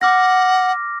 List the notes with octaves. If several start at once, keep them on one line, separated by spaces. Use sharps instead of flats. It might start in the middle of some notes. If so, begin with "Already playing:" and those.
F#5 D6 F6 A#6